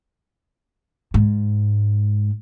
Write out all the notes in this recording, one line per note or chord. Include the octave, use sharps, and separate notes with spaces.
G#2